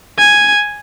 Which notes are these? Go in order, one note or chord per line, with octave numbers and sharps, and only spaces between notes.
G#5